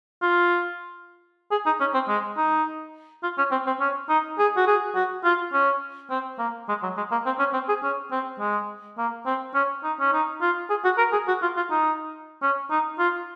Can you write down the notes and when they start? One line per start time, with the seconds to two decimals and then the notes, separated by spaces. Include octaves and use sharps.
0.22 F4
1.51 G#4
1.66 D#4
1.80 C#4
1.94 C4
2.08 G#3
2.37 D#4
3.23 F4
3.38 C#4
3.52 C4
3.67 C4
3.80 C#4
4.09 D#4
4.39 G#4
4.57 F#4
4.67 G#4
4.95 F#4
5.24 F4
5.53 C#4
6.10 C4
6.39 A#3
6.69 G#3
6.83 F#3
6.97 G#3
7.11 A#3
7.26 C4
7.39 C#4
7.54 C4
7.69 G#4
7.83 C#4
8.11 C4
8.40 G#3
8.98 A#3
9.26 C4
9.55 C#4
9.83 D#4
10.00 C#4
10.13 D#4
10.42 F4
10.70 G#4
10.85 F#4
10.98 A#4
11.13 G#4
11.28 F#4
11.42 F4
11.57 F4
11.71 D#4
12.42 C#4
12.71 D#4
12.99 F4